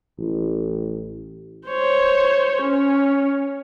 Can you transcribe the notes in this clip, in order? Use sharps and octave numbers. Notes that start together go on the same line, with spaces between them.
A1
C5 C#5
C#4